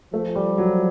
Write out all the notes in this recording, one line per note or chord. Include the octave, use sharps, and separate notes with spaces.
F3 A3
G3
F#3